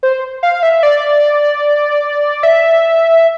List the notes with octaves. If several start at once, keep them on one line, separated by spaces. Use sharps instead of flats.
C5
F5
E5
D5
E5